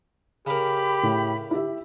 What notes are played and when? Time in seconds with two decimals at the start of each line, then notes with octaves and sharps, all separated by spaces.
0.47 C#3 G4 A#4 B5
1.03 A2
1.51 E4 G4 E5